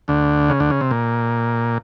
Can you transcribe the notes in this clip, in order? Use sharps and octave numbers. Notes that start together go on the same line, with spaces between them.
D2 D3
C#3
D2 D3
C#3
C3
A#2